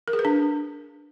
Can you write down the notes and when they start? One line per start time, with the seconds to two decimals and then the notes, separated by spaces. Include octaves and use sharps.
0.08 A#4
0.13 G#4
0.19 B4
0.25 D4